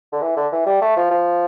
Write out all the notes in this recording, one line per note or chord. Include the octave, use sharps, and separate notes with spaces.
D3
E3
D3
E3
G3
A3
F3
F3